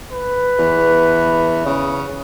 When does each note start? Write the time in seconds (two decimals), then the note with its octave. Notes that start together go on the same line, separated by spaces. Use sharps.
0.12 B4
0.58 E2
1.66 C#3